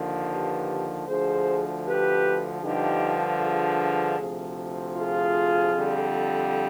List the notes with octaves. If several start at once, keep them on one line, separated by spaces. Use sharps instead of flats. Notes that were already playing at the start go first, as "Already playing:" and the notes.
Already playing: D#2 D3 F3
G4 B4
D2 D3 F3 G#4 C5
G4 B4
G2 D3 F3 D#4 G4
F4 G#4
D2 C3 F3
F4 G#4
F2 D3 G3